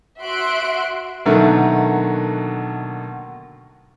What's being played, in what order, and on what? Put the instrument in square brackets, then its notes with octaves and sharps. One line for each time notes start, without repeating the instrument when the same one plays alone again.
[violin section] F#4 E5 C6 F#6 D7
[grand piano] B2 D3 D#3 F#3 A3 A#3